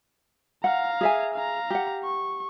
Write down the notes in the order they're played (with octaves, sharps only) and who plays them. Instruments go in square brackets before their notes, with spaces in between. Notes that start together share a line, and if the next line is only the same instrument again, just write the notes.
[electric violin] F5 A#5 [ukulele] F#5
[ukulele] G#4 E5 G#5
[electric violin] F5 A#5
[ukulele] G4 F#5
[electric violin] C#6